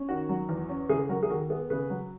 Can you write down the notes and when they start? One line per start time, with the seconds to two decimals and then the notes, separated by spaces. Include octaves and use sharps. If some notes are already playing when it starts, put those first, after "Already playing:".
Already playing: C#4
0.09 D#3 F#4
0.29 F#3
0.49 E2
0.69 C#4
0.89 C#3 G#4
1.09 F#3 F#4 A#4
1.23 G#4
1.30 D#2 F#4 A#4
1.50 B3 G#4
1.70 C#3 G#4 B4
1.90 F#3